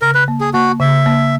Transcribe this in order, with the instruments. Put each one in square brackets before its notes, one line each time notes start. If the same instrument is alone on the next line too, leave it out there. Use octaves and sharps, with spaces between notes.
[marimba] C#3 [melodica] A#4
[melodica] B4
[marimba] A#3
[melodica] G#4
[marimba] A#3 [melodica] F#4
[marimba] C#3 [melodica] E5
[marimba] A#3